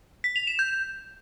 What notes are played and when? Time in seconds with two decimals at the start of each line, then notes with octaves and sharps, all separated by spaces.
0.24 B6
0.36 F7
0.47 E7
0.59 G6